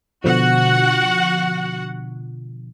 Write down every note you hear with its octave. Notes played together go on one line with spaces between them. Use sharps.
B2 D3 F3 F#4 F#5